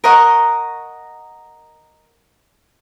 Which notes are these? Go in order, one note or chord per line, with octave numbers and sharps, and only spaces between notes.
A#4 D#5 F#5 C#6